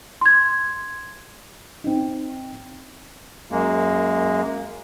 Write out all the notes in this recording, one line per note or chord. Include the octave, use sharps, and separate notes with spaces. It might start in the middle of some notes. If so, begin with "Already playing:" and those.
C6 G#6
C4 D#4
F#2 G#3 A#3